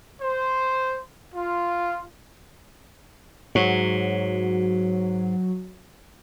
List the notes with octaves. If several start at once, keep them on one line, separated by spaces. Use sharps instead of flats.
C5
F4
G#2 F#3